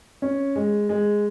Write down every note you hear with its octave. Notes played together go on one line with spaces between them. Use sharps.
C#4
G#3
G#3